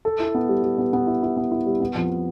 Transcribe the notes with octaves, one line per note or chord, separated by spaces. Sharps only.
A4
E4
B3
G3
G3
B3
B3
E4
E4
B3
E4
G3
B3
F2